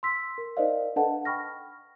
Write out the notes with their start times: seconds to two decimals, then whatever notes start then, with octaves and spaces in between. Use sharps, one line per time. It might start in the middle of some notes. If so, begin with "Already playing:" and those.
0.03 C6 E6 B6
0.38 A#4
0.57 D#4 A#4 C5 D5 D#5 F5
0.96 D4 A4 B4 D#5 F#5 A5
1.25 G5 B5 C#6 F6 A#6